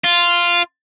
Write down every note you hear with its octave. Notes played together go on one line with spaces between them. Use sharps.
F4